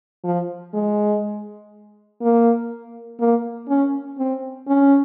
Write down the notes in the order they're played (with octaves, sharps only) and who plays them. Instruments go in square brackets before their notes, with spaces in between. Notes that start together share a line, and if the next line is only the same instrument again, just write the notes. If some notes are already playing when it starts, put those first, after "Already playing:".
[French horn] F3
G#3
A#3
A#3
C#4
C4
C#4